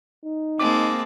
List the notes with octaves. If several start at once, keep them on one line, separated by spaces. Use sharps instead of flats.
D#4
G#3 A#3 C4 A5 D6